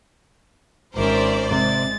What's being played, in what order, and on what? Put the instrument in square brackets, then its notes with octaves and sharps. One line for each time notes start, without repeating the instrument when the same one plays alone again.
[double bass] G#1 C#4 [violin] A#4 E5 [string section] C5 D5
[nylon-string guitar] C3 [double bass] G#3 [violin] A6